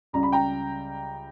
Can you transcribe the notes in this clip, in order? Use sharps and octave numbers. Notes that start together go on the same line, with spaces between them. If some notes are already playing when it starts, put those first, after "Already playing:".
C#2 C#3 G3 A#5
B5
G5 A#5